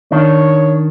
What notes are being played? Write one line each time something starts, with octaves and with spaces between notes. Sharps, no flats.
D#3 D4 C#5